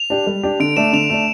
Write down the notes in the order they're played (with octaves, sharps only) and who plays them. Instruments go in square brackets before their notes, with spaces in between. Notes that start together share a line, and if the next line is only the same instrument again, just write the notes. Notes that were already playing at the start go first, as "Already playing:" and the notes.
Already playing: [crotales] F7
[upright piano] D4 G4
G3
D4 G4
[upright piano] D3 [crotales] D7
[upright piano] A3 D4 [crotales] E7
[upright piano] D3 [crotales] F7
[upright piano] A3 D4